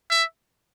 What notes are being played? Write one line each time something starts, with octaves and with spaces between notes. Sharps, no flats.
E5